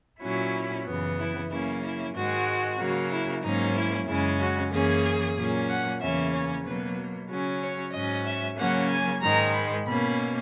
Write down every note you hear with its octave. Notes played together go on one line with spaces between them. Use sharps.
A#2 F#3 C#4 E4
F#2 C#3 E3 B3
E4
C#3 F#3 A#3 C#4 E4
E4
G#2 D#3 G#3 F#4
C#3 F#3 A#3
E4
G#2 F#3 A#3 C#4 D#4
E4
F#2 C#3 G#3 C#4 E4
F#4
F#2 E3 A#3 C#4 G#4
A#2 F#3 A#3 C#4
F#5
E2 C#3 E3 A#3 C#4 E5
C#5
B2 F#3 A#3 B4
C#3 F#3 C#4
C#5
G#2 F#3 C#4 D#5
E5
C#3 F#3 A#3 C#4 F#5
G#5
G#2 D#3 G#3 A#5
B5
B2 A#3 C#4 B5